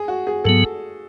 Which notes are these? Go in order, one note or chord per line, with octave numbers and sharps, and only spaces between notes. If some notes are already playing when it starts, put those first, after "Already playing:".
Already playing: G#4
F#4
G#4
G#2 F#3 B3 A4